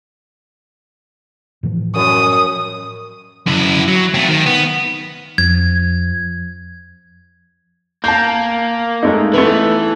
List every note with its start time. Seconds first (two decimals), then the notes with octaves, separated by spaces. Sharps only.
1.63 A2 E3 F3
1.96 F#2 D#6
3.47 F#2 E4
3.88 F#3
4.14 A3 C4
4.28 D#3
4.46 B3
5.38 F2 F3 G#6
8.04 A#3 A5 G6
9.03 G#3 A3 D#4
9.34 E3 A3 B3